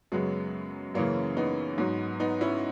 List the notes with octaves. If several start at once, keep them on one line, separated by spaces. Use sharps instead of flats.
F#2 C#3 F#3 G#3 B3
F#2 C#3 E3 A#3 C#4
B3 D#4
G#2 F#3
B3 D#4
C#4 E4